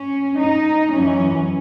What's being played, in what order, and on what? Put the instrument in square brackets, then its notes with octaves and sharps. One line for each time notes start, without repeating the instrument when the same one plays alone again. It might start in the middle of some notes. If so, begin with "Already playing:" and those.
Already playing: [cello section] C#4
D#4
F#2 E3 C#4